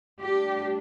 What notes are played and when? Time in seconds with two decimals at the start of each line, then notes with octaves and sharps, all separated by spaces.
0.20 A2 G3 D4 G4